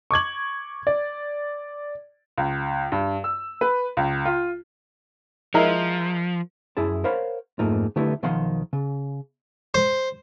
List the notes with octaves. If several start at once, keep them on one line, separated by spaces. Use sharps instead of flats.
C#6 D6 G#6 F#7
D5
C#2
G2
E6
B4
C#2
F4
F3 G#3 E4 A#4
F#2 E4 G#4 A5
A#4 C5 C#5 F5 F#5 B5
F2 G#2 A3 A#3 D#4 F4
D3 A3 B3 E4 G4
B1 D#3 F3 F5 F#5 C6
C#3
C5